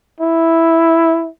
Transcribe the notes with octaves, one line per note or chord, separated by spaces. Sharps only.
E4